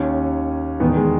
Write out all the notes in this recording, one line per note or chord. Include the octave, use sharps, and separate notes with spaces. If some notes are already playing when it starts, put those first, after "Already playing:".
Already playing: D#2 D#3 C#4
E1 E2 D#3 B3
G#3